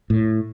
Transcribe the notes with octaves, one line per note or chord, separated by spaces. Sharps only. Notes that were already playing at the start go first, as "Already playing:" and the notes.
A2